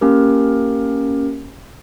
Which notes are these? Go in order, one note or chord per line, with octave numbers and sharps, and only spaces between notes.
A#3 C#4 G4 A#4